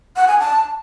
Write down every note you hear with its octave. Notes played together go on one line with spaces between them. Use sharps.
F#5
G#5
A5